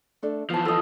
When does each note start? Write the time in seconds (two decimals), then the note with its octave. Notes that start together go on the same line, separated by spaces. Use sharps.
0.22 A3 D4 A4
0.50 E3 F3 B3 A5
0.65 A4 D#5